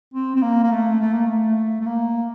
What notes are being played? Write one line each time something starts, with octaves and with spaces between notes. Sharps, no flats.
C4
C4
A#3
A#3
A3
A3
A#3
A3
A3
A#3